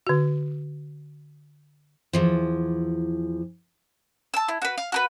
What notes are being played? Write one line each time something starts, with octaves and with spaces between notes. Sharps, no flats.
D3 F#4
E2 E3 F3
A5 E6
E4
F#4 B4
F5
F#4 A#4 B4